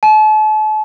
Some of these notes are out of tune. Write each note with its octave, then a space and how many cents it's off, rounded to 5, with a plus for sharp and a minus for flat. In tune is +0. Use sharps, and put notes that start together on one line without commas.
A5 -40